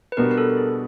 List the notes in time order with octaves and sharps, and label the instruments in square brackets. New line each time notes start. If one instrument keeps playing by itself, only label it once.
[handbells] B4
[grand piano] B2 G3 B3 D4 F#4 [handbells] A#4
[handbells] A#4
A4
G#4